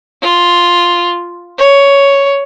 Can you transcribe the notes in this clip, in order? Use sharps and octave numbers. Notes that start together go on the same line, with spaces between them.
F4
C#5